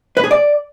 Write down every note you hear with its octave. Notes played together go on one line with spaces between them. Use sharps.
B4
G#4
D5